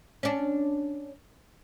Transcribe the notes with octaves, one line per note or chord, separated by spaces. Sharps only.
C#4 D4